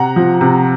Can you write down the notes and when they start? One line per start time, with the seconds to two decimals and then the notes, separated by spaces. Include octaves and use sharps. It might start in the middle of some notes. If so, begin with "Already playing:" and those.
Already playing: C3 F#5 A#5
0.16 F3
0.41 C3